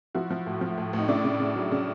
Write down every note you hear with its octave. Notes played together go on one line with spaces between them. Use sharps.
F3 E4 F#4
F3
A2
F3
A2
A2
D#4
C#3 D4 E4
C#3
C#3
F#3
C#3